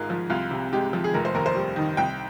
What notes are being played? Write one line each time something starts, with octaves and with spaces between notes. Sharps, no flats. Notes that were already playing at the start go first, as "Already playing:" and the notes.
Already playing: G#1 G#2 G#3 F4 G#4 A#4
F3
C2 F4
C3
G#3 G4
F3
G#4
F1 A#4
C5
D#2 A#4
C5
G3
D#3
C2 G5